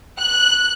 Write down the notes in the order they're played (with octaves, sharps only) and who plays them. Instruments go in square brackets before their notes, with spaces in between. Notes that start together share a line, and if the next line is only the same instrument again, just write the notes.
[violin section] F#6